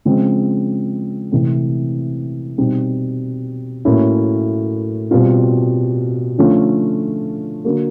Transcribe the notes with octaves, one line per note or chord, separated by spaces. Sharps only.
C#3 F3 G#3 C4
C3 E3 A3 C4
B2 G3 C4 D#4
A2 F#3 A#3 C#4 E4
B2 G3 C4 F4
D3 F3 A3 C#4 F4
D3 F#3 A#3